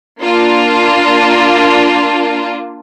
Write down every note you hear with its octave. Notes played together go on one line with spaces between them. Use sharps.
A#3 D4 F4